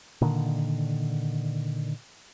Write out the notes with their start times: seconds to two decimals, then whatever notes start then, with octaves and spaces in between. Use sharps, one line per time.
0.21 A#2 D3 D#3